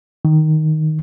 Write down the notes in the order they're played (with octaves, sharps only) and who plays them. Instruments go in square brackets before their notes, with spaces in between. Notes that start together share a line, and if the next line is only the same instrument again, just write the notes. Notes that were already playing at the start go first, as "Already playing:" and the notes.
[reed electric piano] D#3